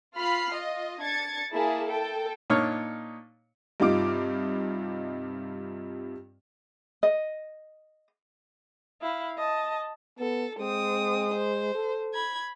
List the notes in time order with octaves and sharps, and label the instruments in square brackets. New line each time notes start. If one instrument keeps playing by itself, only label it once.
[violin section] F4 B5 F6 C7
F4 D#5
D4 G#6 A6 C#7
A#3 E4 G#4 A5
A4 G5
[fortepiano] A#2 D4 D#4 C#5 C#6 F6
[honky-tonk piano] G2 C3 D#4 F4 D6 D7
[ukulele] D#5
[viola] E4 F5
D#5 A5
[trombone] B3 [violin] A4
[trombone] G#3 [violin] C4 D#6
[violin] C5
[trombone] A4
[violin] B5 G#6